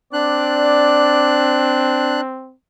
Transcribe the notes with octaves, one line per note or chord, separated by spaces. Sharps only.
C4 D4 D5 F#6